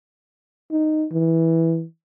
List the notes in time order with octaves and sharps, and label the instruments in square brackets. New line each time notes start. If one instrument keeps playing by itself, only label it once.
[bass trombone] D#4
E3